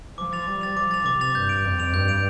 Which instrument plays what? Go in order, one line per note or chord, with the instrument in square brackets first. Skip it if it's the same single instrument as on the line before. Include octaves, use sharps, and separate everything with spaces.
[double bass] F3 [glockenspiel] D6
[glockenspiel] A6 F7
[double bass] G3 [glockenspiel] D6
[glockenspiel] A6 F7
[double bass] F3 [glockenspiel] D6
[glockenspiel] A6 F7
[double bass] C3 [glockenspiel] D6
[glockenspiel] A6 F7
[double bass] G2 [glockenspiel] G6
[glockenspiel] D7 F7
[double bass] F2 [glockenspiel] G6
[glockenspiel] D7 F7
[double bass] G2 [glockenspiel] G6
[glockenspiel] D7 F7